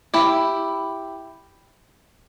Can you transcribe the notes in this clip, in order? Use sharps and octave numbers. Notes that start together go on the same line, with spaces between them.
E4 G4